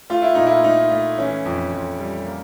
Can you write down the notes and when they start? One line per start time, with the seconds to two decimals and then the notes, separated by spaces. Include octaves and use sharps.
0.10 A3 F4
0.22 E4
0.35 A#2 D#4
0.47 E4
0.64 A3 D#4
0.91 A3
1.18 E3 C#4
1.45 F2
1.73 F2
1.99 G3
2.26 A#3